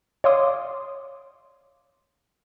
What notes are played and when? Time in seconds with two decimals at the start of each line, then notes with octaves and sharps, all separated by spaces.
0.24 C#5 D5 F5 C6 D6 D#6